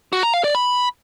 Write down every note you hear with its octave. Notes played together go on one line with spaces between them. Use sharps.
F#4
A#5
F5
D5
B5